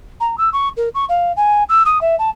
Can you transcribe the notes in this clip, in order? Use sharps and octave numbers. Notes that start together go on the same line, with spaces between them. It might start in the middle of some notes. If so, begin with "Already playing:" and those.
A#5
E6
C#6
A#4
C#6
F5
G#5
E6
D#6
E5
A5